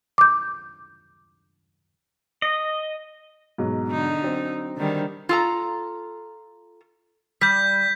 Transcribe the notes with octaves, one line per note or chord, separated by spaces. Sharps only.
D6 G6
D#5
G#2 B2 F#3
D3 D#4
F#3 C4
D3 D#3 G3
F4 A4 A#5
G3 G6 B6